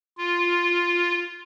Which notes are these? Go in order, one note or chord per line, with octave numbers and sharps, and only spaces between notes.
F4